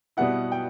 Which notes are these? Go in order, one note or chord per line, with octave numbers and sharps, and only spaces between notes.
B2 G3 B3 E4 F#5
G5